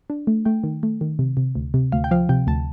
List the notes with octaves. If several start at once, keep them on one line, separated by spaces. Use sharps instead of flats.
D4
A3
A3 G5
D#3
A3
D#3
C3
C3
D2
C3
D2 F5
G5
F3 F5
C3 G5
D2 A5